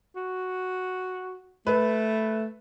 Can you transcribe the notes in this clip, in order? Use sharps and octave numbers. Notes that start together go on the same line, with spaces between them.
F#4
A3 B4